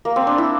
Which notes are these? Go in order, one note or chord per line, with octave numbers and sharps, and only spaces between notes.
A#3
C4
D4
E4